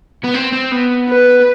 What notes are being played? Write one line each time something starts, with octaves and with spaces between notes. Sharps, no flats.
B3
C4
C4
B3
B4